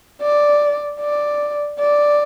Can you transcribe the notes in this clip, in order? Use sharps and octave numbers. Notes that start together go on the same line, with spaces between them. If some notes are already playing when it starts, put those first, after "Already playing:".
D5
D5
D5